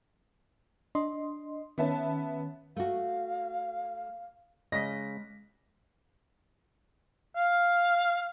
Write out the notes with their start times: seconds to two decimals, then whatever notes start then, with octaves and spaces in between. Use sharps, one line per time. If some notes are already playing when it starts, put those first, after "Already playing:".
0.95 D4 D#5 C6
1.78 D#3 B3 C#4 E5 A5
2.76 A3 F#4 F5
4.72 C#3 G#3 D#5 A#6 B6
7.36 F5